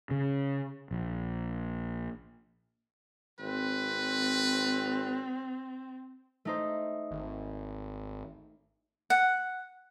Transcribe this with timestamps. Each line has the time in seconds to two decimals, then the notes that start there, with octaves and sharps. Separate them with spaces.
0.11 C#3
0.91 A#1
3.40 G#1 C4 B4
6.45 A3 D#4 C5
7.11 G#1
9.10 F#5